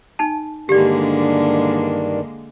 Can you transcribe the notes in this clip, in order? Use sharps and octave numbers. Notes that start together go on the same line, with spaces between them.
D#4 G#5 A5
G2 D3 D#3 G#3 A#3 D4 G4 D5